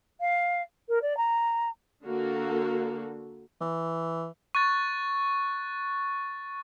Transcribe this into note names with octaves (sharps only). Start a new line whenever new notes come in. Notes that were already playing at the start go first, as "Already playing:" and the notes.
F5
A#4
D5
A#5
D3 A#3 F#4 A4
E3
C#6 F#6 A6